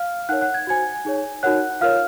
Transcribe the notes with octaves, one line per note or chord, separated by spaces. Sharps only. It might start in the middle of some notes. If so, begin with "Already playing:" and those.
Already playing: F5 F6
D#4 A#4 C#5 F#5 F#6
F#5 F#6
G#6
F#4 C5 G#5 G#6
D#4 G#4 C#5
D#4 F#4 A#4 C#5 F#5 F#6
F4 A#4 C#5 F5 F6